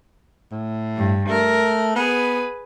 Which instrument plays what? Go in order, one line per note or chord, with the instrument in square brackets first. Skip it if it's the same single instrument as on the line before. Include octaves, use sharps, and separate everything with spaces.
[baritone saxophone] A2
[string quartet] G2
[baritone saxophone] A3 [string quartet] A#4
[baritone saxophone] B3 [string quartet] G#4 B4